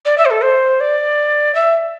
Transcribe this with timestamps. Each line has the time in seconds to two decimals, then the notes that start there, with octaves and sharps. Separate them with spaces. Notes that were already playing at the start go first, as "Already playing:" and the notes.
0.05 D5
0.18 E5
0.25 C5
0.30 A4
0.43 C5
0.80 D5
1.55 E5